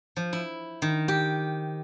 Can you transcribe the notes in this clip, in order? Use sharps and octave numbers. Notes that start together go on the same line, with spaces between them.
F3
E4
D#3
G4